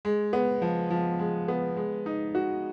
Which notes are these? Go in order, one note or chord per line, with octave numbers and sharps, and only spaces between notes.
G#3
B3
F3
F3
G#3
B3
G#3
D#4
F#4